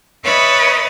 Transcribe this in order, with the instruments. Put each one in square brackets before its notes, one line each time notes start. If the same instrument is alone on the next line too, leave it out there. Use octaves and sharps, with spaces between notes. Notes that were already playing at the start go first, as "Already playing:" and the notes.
[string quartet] B4 C#5 D#5 E5 B5 A6